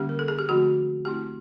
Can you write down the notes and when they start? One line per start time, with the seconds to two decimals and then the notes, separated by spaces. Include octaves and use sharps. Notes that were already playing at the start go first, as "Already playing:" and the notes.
Already playing: D3 G3 A#3 C#4 G4
0.09 A#4
0.19 A4
0.28 G#4
0.39 G4
0.49 D3 F3 A3 C4 D#4 F#4
1.05 A3 C4 E4 G4